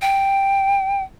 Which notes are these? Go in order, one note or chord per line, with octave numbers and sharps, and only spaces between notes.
G5